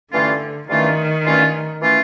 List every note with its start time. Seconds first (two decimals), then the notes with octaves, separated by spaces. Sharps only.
0.13 G2 D3 E3 A3 C#4 F4
0.69 G2 D#3 E3 A3 C#4 F4
1.25 G2 E3 A3 C#4 F4
1.82 E3 A3 C#4 F4